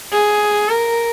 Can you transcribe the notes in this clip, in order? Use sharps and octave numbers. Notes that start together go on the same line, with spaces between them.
G#4
A#4